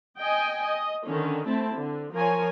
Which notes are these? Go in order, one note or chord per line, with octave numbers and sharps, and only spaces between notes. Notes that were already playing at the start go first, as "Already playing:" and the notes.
D#5 G5 G#5
D#5
D3 D#3 C#4
A3 C4 E4 A5
D3
F3 A#4 C#5 G#5